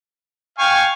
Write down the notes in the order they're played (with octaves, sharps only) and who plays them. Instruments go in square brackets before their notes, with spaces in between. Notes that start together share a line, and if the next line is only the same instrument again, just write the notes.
[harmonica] F5 G#5 C#6 [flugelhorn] G5